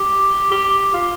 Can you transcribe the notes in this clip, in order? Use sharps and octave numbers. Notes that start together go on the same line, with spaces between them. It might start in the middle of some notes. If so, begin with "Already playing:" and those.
Already playing: G4
G4
F4